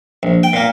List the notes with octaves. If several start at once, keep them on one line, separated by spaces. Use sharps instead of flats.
A#1
G5
A#2 A#3